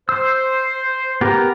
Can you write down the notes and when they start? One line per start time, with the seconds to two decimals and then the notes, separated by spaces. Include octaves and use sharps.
0.09 C5 E6
1.21 B3 G4 A#4 A#5